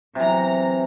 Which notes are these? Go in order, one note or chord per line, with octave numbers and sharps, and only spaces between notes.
C3 E3 F#3 A#5